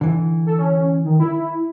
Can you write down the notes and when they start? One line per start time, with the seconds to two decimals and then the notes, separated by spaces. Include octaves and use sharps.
0.01 D3 E3
0.46 A4
0.59 C#4
1.04 D#3
1.20 E4